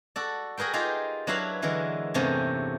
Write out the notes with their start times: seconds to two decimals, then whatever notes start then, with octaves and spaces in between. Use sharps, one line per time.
0.16 F#4 A4 D5
0.58 F#4 G#4 A#4 B4 G5
0.73 D#4 F4 G4 G#4 A#4 E5
1.27 F#3 D4 E4 F#4 B4 F5
1.62 D3 E3 F#3 G#3 A#4
2.14 E2 G2 C3 A3 A#3 C#4